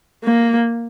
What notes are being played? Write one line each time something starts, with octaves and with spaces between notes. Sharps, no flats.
A#3